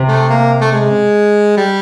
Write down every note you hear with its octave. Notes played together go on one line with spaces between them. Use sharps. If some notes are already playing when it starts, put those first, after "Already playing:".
Already playing: C3
A3
A#3
A3
G#3
G3